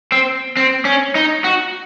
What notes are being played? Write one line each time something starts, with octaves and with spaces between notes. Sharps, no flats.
C4
C4
C#4
D#4
F#4